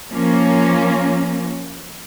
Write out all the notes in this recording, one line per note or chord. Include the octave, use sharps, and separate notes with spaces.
F3 A#3 C#4